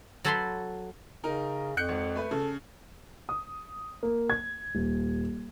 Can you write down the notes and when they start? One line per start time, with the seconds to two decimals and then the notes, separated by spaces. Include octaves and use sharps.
0.24 F#3 A4 C#5 A5 B5 C6
1.24 C#3 D#4 A#4
1.77 F2 F#6 G6 C#7
1.89 G#1
2.15 A3 B4
2.31 C#3 A4
3.29 D#6
4.03 A#3
4.30 G#6
4.75 D#1